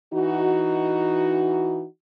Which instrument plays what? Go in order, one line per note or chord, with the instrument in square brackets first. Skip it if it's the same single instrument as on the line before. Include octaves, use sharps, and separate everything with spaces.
[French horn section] E3 D#4 F#4